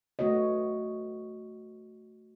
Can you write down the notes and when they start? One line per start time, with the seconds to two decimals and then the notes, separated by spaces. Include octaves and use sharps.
0.19 A3 B3 F#4 C#5 D#5